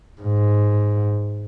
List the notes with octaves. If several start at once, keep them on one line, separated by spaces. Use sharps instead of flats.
G#2